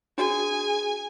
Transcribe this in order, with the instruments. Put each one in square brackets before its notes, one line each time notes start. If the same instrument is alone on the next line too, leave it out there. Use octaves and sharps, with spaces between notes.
[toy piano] D4 F#4 [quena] G#4 [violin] G#5